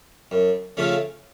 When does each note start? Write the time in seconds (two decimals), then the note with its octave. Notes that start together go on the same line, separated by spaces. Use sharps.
0.31 F#2
0.77 C#3 F3 A3 C#4